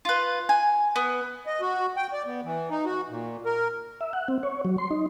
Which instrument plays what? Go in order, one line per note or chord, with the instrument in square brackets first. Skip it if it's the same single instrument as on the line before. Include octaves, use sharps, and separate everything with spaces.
[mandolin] F4 B4
G#5
B3
[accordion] D#5
F#4
G5
D5
B3
E3
D#4
F#4
A#2
A#4
[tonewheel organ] E5
F#5
C4
C#5
F#3
C6
D#4